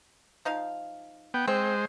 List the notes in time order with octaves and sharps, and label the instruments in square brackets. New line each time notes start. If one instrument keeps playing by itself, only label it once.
[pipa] F3 D#4 F5
[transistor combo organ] B3 G5
[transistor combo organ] G#3 C5 [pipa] C4